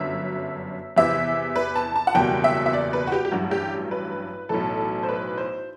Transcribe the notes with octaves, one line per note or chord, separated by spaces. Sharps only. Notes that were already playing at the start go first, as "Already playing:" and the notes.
Already playing: G1 F#2 D3 F#3 E5
E2 C3 E3 E5
B4
A5
A5
F#5
F#1 E2 B2 G3 G5
E5
E5
D5
B4
F#4
G4
G4
A1 G2 F#3 F#4
G4
B4
B1 A2 E3 A4
C5
B4
C5